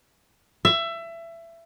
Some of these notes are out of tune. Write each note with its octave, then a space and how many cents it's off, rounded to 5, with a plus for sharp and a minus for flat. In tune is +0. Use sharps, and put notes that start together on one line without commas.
E5 +20